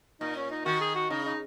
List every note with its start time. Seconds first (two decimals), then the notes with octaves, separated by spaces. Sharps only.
0.21 A#2 D#4
0.36 C#4
0.51 D#4
0.65 D#3 F#4
0.81 G#4
0.95 F#4
1.10 C#3 D#4
1.25 D#4